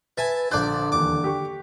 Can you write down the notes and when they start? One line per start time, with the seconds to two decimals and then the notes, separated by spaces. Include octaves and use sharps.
0.18 B4 E5 G#5 A5 A6
0.51 A#1 D3 C5 D5 F#6
0.92 D#1 E2 D6
1.24 G4 C#6